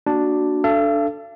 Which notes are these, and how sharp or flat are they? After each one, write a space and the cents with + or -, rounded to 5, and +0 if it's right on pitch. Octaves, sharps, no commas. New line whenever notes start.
A#3 +0 D4 +0 F#4 +0
D4 +0 A4 +0 F5 -45